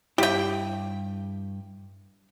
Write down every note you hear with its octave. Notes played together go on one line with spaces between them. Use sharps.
G2 E4 G4 G5